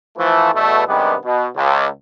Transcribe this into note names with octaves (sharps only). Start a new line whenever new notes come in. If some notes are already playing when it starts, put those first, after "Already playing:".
E3 F3 A3
E2 B2 A3
G2 C3 D#3 G3 G#3 B3
B2
C#2